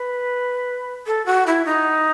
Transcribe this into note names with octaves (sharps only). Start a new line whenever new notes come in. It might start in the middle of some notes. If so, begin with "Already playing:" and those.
Already playing: B4
A4
F#4
E4
D#4